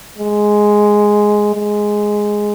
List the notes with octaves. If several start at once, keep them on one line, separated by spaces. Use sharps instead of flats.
G#3
G#3